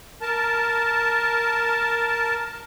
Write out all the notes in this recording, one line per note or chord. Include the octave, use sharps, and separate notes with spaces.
A#4 A5